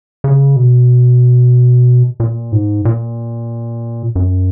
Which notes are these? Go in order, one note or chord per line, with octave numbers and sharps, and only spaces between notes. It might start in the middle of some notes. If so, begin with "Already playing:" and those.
C#3
B2
A#2
G#2
A#2
F#2